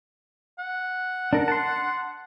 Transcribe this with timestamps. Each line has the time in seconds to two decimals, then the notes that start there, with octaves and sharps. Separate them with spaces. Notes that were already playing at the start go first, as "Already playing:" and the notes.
0.59 F#5
1.33 D4 A#4
1.48 A5 C6